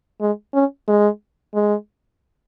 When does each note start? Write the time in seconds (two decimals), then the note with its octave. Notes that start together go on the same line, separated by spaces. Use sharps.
0.21 G#3
0.54 C#4
0.88 G#3
1.54 G#3